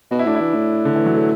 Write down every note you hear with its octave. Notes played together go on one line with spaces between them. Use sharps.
B2 F#4
E4
A2 D4
E4
E3
A2
D3
E3
F#3
A3